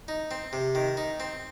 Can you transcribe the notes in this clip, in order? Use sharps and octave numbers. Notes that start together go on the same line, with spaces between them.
D#4
C4
C3
D#3
D#4
C4